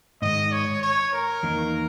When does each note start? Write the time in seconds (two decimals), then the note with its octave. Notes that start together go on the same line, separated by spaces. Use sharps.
0.22 G#2 D#3 G#3 D#5
0.52 C#5
0.82 C#5
1.13 A#4
1.43 E2 D#3 A#3 D#4